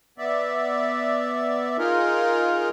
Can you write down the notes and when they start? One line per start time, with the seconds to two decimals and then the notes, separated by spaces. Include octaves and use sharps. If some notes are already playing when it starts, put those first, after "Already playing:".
0.18 B3 D5 E5
1.78 D#4 F4 G#4 A#4